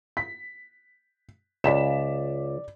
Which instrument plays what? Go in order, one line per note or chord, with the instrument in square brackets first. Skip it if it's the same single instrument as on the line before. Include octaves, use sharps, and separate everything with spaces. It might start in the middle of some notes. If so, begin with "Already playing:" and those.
[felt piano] B6
[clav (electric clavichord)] C#2 [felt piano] D5 B6 E7